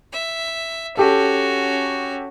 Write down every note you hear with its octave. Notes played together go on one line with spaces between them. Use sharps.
E5
C#4 F#4 G4 A4